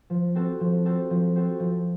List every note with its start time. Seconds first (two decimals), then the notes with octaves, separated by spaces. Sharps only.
0.10 F3
0.35 C4 F#4 A4
0.60 F3
0.86 C4 F#4 A4
1.10 F3
1.36 C4 F#4 A4
1.60 F3